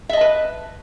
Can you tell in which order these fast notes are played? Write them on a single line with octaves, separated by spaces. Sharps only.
E5 D#5 A5 B4